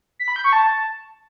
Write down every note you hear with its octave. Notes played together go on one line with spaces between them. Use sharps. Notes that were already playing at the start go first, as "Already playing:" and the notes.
B6
B5
G6
C#6
A5